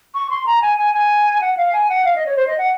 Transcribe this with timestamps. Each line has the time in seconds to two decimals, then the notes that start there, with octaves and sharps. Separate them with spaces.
0.15 C#6
0.30 C6
0.46 A#5
0.62 G#5
0.78 G#5
0.94 G#5
1.41 F#5
1.57 F5
1.73 G#5
1.89 F#5
2.05 F5
2.16 D#5
2.26 C#5
2.37 C5
2.47 D#5
2.58 F#5